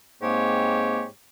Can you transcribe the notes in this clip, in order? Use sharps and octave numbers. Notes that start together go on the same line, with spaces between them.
G#2 G#3 A#3 C4 G4 C#5